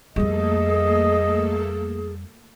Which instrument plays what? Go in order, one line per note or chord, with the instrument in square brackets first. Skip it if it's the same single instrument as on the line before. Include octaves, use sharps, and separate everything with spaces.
[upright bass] F2 G3 [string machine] A3 A#3 A4 [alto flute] G#4 [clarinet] D#5